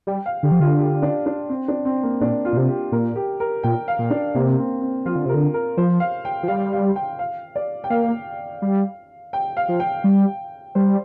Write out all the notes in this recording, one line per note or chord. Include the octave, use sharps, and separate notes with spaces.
G3 G5
F5
D3 G4
F3
D3 F4
G4
D4
D4
C4
D4
C4
A#3
A#2 D4
F4
A#2
C3
G4
A#2 A#4
G4
A#4
A#2 G5
F5
A#2
D4
C3 A#3
C4
C4
F3 F4
D3
C3 A#4
D3
A#4
F3 C5
F5
G5
F3
G3 F5
F5
G5
F5
D5
G5
A#3 F5
G3
G5
F5
F3
G5
G3
G3 C5